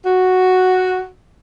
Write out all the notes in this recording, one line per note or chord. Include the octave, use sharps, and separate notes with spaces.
F#4